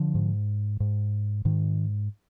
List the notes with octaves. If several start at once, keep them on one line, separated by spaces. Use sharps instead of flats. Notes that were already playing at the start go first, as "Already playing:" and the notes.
Already playing: D3 F3
G#2
G#2
G#2 D#3